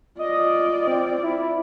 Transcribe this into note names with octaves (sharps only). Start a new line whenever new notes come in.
F4 D5 D#5
C4
E4